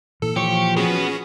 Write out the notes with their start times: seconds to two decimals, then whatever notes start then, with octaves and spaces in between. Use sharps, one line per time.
0.22 A#2 E3 A4
0.36 F3 G4 C#5 C#6 C#7
0.77 B3 C#4 F#4 G#4 B4